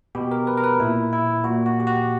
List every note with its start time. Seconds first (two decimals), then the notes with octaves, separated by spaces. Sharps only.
0.15 B2 G4
0.31 A#4
0.47 B4
0.57 A#4
0.64 B4
0.80 A#2 E4
1.13 E4
1.44 A#2 F#4
1.66 F#4
1.80 G4
1.87 F#4